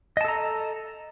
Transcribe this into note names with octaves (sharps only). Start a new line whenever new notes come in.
A4 D#5 A5 A#5